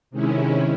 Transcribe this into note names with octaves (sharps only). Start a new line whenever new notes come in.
C3 D#3 G#3 C#4 E4